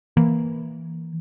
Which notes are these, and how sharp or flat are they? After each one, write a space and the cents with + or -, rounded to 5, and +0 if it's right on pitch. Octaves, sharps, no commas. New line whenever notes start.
E3 +0 A#3 +0